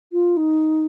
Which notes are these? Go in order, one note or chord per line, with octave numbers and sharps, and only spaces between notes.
F4
D#4